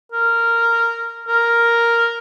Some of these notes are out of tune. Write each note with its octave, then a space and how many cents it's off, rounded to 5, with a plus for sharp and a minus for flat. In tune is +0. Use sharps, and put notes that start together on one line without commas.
A#4 -10
A#4 +0